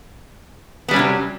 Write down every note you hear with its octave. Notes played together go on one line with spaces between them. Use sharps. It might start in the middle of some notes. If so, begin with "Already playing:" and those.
C3 F#3 G3 B3 C#4